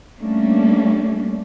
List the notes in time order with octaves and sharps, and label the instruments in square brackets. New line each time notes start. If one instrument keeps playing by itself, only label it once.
[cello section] G3 A3 A#3 C#4 D4